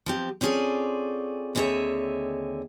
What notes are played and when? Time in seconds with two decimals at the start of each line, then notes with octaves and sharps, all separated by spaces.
0.06 F3 C4 G4
0.41 C4 C#4 F4 G#4 A4 D5
1.55 D#2 D3 C4 G#4 C#5 E5